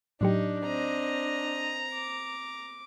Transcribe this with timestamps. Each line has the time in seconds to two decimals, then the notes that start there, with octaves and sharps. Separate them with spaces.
0.21 A2 F#3 D4 D#4 G4
0.66 C4 D#5 A#5
1.93 D6